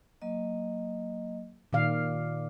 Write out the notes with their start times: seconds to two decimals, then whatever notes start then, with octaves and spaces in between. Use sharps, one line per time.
0.22 F#3 A#3 D#5
1.73 A#2 D#3 D5 F5 D6